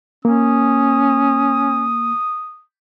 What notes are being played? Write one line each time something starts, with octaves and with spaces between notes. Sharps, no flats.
A#3 C#4 D#6